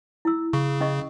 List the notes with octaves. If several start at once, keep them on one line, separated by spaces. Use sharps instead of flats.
E4 E6
C#3 C#6
C#4 D#5 C#6